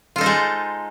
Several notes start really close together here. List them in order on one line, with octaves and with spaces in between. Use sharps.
F4 A4 D#4 C5 G#3